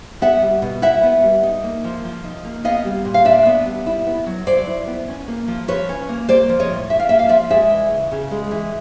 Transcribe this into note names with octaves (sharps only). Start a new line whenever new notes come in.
B3 E5 F#5
G3
B2
E4 E5 F#5
B3
G3
D#4
A#3
F3
F3
D#4
A#3
B3 D#5 F5
G3
A#2
F5
D4 D5 E5
B3
G3
E4
B3
F#3
F#3 C5 D5
E4
B3
C#4
A#3
F3
F3 B4 C#5
C#4
A#3
A#3 C5 D5
F3
C#5 D#5
A2
D4 E5
F5
A#3 E5
F5
F3 D5 E5
G#3 D5 E5
E3
C#3
C#3
G#3
E3